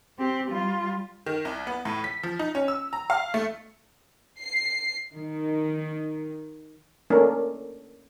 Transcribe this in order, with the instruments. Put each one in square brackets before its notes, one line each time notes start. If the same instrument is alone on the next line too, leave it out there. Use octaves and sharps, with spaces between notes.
[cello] C4 G4
G3 F4
[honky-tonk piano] D#3
C2
B3
A2
B6
F3
D#4
C#4
E6
A#5
F5
A3
[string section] C7
D#3
[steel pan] A3 A#3 C#4 D4 A#4